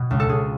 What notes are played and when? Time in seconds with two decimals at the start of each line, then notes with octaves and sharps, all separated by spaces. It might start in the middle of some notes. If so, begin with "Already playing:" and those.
Already playing: B2
0.11 C#2
0.20 A4
0.29 C#2 G#4